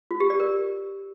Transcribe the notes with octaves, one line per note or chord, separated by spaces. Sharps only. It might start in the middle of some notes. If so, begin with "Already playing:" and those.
F4
G4
D5
A#4